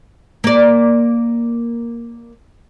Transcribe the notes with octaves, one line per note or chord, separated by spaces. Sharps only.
A#3 D5